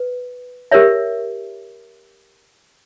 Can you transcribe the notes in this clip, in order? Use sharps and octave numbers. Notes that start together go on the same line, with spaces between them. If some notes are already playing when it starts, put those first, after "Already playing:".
Already playing: B4
G4 A#4 C#5 E5